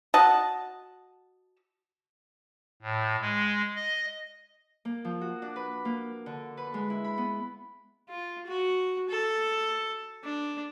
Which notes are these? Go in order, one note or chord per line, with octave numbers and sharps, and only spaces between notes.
F#4 D#5 F#5 A5
A2
G#3
D#5
A#3
F3
F#4
D4
B4
A#3
D3
B4
G#3
E4
B5
B3
F4
F#4
A4
D4